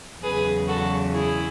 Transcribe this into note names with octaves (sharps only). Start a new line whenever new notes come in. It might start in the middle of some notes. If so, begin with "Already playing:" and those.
E2 C#3 F#3 G#4 B4
F#4 A4
E4 G#4